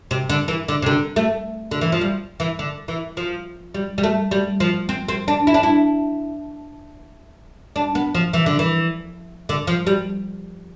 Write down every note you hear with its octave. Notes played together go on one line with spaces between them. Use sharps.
C3
D3
E3
D3
C3
D3
A3
D3
E3
F3
G3
E3
D3
E3
F3
G3
G3
A3
G3
F3
C4
C4
D4
E4
D4
E4
D4
B3
F3
E3
D3
E3
D3
F3
G3